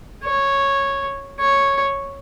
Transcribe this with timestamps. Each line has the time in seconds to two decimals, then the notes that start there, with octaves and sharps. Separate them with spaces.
0.25 C#5
1.40 C#5